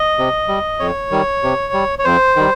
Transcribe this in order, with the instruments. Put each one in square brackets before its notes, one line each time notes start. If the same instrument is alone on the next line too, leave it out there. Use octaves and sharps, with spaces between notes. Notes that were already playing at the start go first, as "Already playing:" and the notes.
Already playing: [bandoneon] D#5
C3
G3
F2 C#5
D#3 G3
C3
G3
C#5
F2 C5
D#3 G3